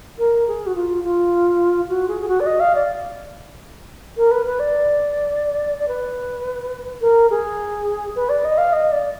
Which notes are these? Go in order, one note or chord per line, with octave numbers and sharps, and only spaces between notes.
A#4
G#4
F#4
F4
F4
F#4
G#4
G#4
F#4
D5
D#5
F5
D5
A#4
B4
B4
D5
D5
B4
A#4
G#4
B4
D5
D#5
F5
D#5
D5